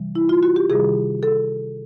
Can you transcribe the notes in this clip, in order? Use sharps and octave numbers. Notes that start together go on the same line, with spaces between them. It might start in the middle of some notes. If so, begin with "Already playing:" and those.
Already playing: C3 E3 G3
E4
F4
F#4
G4
C3 D#3 G3 G#4
A4